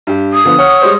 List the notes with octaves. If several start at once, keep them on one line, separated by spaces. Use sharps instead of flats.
G2 G4
D#6
D3 F3 B3
C#5 F#5 F6
G3 G#3 C5